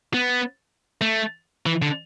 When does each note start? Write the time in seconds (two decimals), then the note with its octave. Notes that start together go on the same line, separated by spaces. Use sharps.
0.14 B3
1.01 A3
1.66 E3
1.82 D3